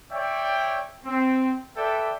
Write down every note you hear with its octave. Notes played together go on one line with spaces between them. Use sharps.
C#5 D5 E5 G5
C4
A4 B4 D5 E5 G5